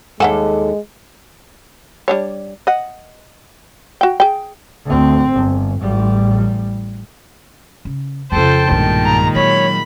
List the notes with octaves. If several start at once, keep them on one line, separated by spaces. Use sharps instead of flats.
D#2 G#3 A4 E5 F#5 G#5
G3 D4 C#5
D#5 F#5
F#4 G5
G#4 G5
D2 C4
G1
A1 G3
C#3
F2 C#3 F4 A4 C5 G5 A5
B1 G2 A#2 D#3 G#3
A#5
F#3 C#5 B5